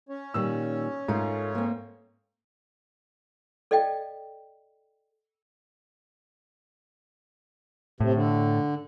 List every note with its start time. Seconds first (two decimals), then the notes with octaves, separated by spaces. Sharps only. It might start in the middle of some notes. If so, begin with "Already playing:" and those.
0.09 C#4 C#5
0.34 A#2 D#3 G3 E6
1.08 G#2 A3 F4 A#4
1.55 A#3 C4
3.71 A4 D5 D#5 F5 G5
8.00 A2 C3
8.13 D3